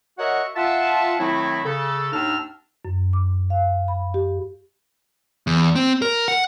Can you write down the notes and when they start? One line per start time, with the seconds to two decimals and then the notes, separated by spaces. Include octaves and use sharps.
0.18 F#4 A#4 C#5 D#5 E5 F#5
0.56 F4 E5 F#5 A5
1.19 D#3 F#3 A3 C4 E4
1.64 C#3 A4
2.13 D#2 A2 D4 D#4 E6 F6
2.85 F#2
3.13 D6
3.50 F5
3.88 B5
4.14 G4
5.47 E2
5.75 C4
6.02 A#4
6.28 F#5